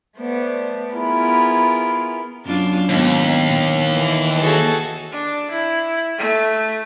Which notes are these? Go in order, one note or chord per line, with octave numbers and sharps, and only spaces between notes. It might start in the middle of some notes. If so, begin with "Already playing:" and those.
A3 B3 C5 D5
B3 E4 F4 G#4 A#4
F#2 D4 F4
D#2 G#2 B3
A#2
E3
F#4 G#4 A4
D4
E4
A3